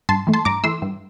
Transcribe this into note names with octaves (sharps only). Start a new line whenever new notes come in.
G2 A5 C6
E3 A3
A5 C6
G2 A#5 D6
E3 A3 C6 E6
G2